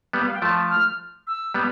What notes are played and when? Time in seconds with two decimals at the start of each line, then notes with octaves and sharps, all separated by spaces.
0.13 G3 B3
0.27 F5
0.34 G5
0.42 F3 A3 A5
0.70 F6
1.27 E6
1.54 G3 B3